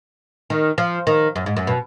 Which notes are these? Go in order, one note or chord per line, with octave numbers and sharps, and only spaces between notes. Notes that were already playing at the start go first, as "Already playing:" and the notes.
D#3
F3
D#3
F#2
G#2
F#2
B2